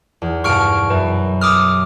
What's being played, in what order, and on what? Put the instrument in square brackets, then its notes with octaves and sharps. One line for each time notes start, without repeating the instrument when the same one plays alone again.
[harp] E2
[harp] G2 B2 [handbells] C#6 F6 D7
[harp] F#2 [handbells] B4
[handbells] D6 D#6 F6